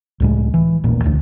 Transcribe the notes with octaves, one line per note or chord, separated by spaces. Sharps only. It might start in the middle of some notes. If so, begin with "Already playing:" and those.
C#2 A2 G#3
E3
D#1 A1 A#2
E1 D2